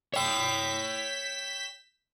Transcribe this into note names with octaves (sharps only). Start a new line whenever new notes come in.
C#5 G5 G6 B6 E7